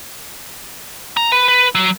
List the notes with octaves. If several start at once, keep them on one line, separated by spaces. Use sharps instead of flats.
A#5
B4
B4
F#3